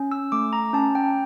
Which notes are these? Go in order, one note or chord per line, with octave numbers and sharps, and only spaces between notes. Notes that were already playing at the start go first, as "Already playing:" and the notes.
Already playing: C#4
E6
A3 D6
A#5
C#4 A5
G5